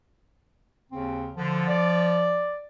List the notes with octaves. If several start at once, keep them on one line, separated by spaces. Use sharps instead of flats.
D#2 C#3 C4
D3 F3
D5